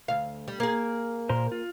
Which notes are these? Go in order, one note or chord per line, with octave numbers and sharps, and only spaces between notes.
D2 F5
G3
A#3 G#4
A#2 A#4 C5
F4